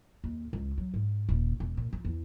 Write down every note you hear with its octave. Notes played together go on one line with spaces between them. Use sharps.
D#2
C#2
F#3
G#2
D#1
E1
A#2
F3
E2